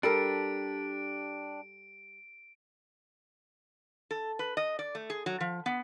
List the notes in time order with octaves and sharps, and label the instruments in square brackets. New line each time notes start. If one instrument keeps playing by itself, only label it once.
[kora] G3 A4 A#4 [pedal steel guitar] D4 G4 [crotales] D7
[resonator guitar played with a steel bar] A4
B4
D#5
D5
A3
G#4
F#3
F3
B3